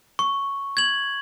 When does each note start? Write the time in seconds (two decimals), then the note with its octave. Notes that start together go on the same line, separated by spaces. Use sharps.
0.19 C#6
0.77 G#6 F#7